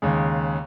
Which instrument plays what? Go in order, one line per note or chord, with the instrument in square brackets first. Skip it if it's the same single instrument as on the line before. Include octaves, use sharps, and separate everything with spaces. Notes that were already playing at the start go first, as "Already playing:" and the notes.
[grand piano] D#2 C#3 G#3